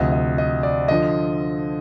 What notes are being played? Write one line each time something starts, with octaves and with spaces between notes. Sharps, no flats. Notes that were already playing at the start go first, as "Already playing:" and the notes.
Already playing: D2 C3 F3 D#5
D#5
D#5
D5
D3 F3 D#5